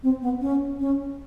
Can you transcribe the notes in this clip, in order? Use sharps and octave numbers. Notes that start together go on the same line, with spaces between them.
C4
B3
C#4
C#4